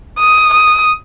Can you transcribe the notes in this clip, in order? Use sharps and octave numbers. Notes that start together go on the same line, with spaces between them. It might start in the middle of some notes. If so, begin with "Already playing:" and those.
D#6
D#6